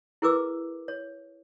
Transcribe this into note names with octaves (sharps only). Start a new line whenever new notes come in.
E4 G#4 A#4 B4 D6 E6
C#5